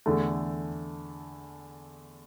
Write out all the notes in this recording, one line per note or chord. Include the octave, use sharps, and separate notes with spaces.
E2 D3 A3